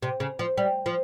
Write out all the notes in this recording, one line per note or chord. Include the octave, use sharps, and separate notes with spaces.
C3
C#3
F3
G3
F3